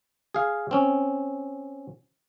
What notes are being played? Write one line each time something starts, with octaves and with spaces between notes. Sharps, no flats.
G#4 F5
C4 C#4